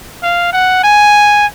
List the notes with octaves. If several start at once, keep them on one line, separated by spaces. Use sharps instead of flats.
F5
F#5
G#5